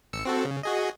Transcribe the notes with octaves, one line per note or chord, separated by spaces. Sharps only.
A1 E6 C#7
C4 F#4 A4
C#3
F#4 G#4 D#5